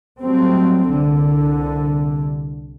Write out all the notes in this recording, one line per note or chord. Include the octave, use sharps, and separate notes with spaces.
F#3 G3 A3 C4
C2 D3